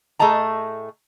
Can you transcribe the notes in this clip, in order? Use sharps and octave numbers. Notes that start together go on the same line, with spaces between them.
A2 A3 G#4 D#5 A5 A#5